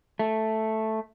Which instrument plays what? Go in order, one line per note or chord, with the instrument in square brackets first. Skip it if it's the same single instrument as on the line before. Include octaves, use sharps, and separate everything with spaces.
[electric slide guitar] A3